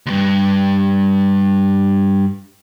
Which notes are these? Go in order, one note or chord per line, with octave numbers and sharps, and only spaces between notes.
D2 G2